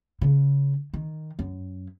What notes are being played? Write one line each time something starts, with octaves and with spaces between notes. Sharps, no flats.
C#3
D#3
F#2